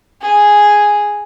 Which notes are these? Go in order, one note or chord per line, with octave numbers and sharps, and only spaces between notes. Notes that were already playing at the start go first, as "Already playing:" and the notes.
G#4